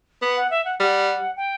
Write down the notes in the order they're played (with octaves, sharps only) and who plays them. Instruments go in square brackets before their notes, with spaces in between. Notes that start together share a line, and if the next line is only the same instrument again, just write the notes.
[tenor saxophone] B3
[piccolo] F#5
E5
F#5
[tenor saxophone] G3 [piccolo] F#5
[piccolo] G5